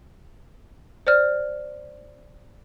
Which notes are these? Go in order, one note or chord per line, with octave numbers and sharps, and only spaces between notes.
C5 D5 F6